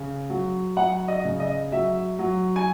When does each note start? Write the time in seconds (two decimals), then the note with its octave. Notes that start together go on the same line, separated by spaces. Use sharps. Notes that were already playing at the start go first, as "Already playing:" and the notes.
Already playing: C#3
0.30 F#3
0.77 F#3 F#5
1.08 D#5
1.25 C#3
1.40 D#5
1.72 F#3 E5
2.19 F#3
2.56 G#5